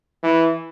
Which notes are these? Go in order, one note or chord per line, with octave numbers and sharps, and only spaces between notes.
E3